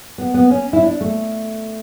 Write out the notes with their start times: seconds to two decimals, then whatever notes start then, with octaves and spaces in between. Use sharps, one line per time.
0.18 B3
0.34 B3
0.50 C#4
0.73 E4
0.83 D4
1.01 A3